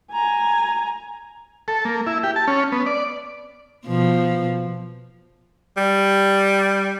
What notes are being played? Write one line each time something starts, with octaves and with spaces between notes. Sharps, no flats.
G#5 A#5
A4
A#3
E4
G4
A5
C#4
B3
D5
B2 F3
G3